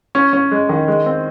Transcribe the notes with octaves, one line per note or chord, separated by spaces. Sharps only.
C#4
C#4
G#3
D#3
G#3
C4